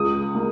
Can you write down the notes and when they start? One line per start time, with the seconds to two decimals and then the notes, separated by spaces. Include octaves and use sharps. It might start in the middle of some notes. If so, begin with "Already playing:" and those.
Already playing: C#2 D#6
0.35 A#3